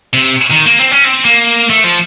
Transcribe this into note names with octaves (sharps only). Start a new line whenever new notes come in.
C3
D#3
A#3
C4
C#4
C4
A#3
A3
F3